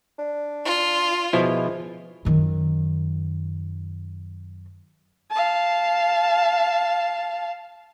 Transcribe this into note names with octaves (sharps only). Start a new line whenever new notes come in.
D4
F4
B2 F3 G#3 E4
F#2 D#3
F5 A5